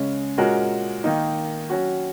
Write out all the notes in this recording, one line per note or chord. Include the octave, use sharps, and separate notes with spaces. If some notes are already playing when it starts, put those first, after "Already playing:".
Already playing: C#3 G#3 C#4
A#2 G#3 C#4 F#4 A#4
D#3 A#3 D#4
F#3 C#4 F#4